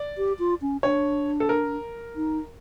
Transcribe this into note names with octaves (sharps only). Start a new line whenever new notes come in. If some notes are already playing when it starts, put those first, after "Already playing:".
Already playing: D5
G4
F4
C#4
D4 C#5
A4
A#4
D#4